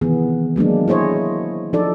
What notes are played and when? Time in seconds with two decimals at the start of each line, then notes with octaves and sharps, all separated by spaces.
0.01 C3 D#3 E3 B3 G#4
0.56 F#3 G#3 A#3 D4
0.88 E4 G#4 C5 C#5 D#5
1.73 F3 D4 D#4 A4 D5